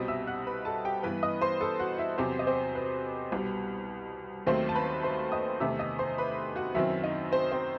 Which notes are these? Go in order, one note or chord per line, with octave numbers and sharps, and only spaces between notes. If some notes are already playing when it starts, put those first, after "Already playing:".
Already playing: C2 B2 G3 C4 D#5 D#6
E5 E6
F#5 F#6
B4 B5
A4 A5
G4 G5
G2 E3 B3 B4 B5
D#5 D#6
C5 C6
A4 A5
F#4 F#5
E4 E5
E2 C3 F#3 C4 C5
D#5
C4 C5
B4
C2 B2 G3
D#2 D#3 F#3 A3 C4 C5
A5
B4 B5
C5 C6
D#5 D#6
E2 C3 D#3 A3 E5 E6
D#5 D#6
C5 C6
B4 B5
F#4 F#5
F#2 D#3 F#3 C4 E4 E5
D#4 D#5
C4 C5
C4 C5